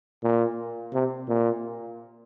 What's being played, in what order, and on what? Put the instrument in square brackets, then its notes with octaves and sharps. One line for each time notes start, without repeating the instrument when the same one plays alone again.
[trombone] A#2
C3
A#2